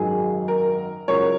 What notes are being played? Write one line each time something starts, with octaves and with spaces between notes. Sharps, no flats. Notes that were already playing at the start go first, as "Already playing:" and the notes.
Already playing: G#1 F#2 D#3 F#3 G#4
A#4
C#2 C#3 F#3 A#4 C#5